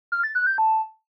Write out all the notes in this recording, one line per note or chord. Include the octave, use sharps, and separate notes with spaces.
F6
A6
F#6
G6
A5